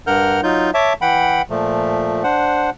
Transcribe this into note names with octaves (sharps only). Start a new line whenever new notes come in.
G2 A#4 F#5 F6 G6
F#3 D#4 F4 G6
C#5 E5 A5 D6
E3 F#5 G5 B5
A#2 F3 A3
D4 C5 F#5